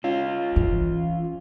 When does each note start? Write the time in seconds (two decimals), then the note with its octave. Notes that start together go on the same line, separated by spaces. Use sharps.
0.04 C#4 F4
0.56 E3